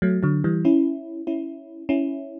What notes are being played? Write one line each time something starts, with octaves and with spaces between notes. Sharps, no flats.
F#3 A3
D3 F#3
E3 G3
C#4 E4
C#4 E4
C#4 E4